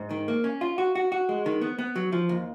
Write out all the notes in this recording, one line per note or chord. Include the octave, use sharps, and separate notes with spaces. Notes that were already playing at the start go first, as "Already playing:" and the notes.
Already playing: G#2
D#3
A#3
C#4
F4
F#4
F#4
F#4
G#3
D#3
B3
B3
F#3
F3
D#2